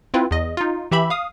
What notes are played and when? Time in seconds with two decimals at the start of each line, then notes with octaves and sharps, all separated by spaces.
0.14 C4 E4 F4 B4
0.31 E2 D#5
0.57 D#4 F4
0.91 E3 G4 E5 B5
1.10 F5 D#6